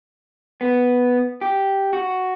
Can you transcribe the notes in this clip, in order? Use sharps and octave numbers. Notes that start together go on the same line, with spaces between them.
B3
G4
F#4